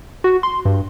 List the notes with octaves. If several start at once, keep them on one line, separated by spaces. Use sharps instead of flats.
F#4
C6
G2